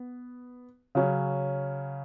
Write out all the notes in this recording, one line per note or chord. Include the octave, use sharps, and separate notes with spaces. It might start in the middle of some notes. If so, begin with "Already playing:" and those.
Already playing: B3
C#3 F#3 C#4